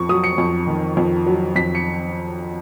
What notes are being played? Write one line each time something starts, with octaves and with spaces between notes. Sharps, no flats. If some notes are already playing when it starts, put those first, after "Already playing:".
Already playing: F2 C#6
F#3 D#6
C#7
F2
D#3
F2
F#3
F2 B6
C#7